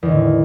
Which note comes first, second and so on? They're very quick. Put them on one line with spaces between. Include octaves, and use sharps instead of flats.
E2 D#3 D3 A2